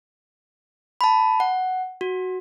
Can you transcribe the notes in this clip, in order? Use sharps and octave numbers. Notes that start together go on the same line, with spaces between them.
A5 B5
F#5
F#4